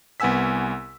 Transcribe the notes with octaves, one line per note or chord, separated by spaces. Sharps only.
C2 B3 F#5 G#5 E6 B6